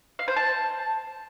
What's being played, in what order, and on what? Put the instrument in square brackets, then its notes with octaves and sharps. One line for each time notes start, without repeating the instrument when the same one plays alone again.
[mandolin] F5
C5
A5